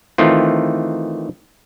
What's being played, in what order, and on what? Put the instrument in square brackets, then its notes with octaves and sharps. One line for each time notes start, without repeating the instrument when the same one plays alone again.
[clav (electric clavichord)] D#3 E3 A3 C4 F4